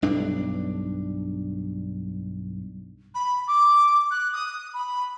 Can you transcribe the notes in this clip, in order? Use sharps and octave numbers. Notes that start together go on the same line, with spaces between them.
B1 G2 D4
B5
D6
F#6
D#6
B5